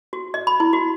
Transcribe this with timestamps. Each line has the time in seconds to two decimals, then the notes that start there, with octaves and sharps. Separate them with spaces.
0.13 F#4
0.34 D#5
0.47 B5
0.60 E4
0.73 F#4